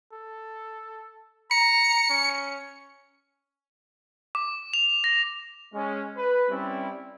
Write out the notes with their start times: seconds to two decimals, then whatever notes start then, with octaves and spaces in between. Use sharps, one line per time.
0.13 A4
1.51 A#5 C#7
2.10 C#4
4.35 D6
4.74 F7
5.04 A#6
5.75 G#3 C#4
6.17 B4
6.50 G3 C4 C#4 E4